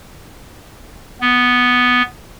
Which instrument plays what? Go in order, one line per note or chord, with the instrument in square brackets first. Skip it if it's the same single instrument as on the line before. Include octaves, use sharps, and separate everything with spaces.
[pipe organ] B3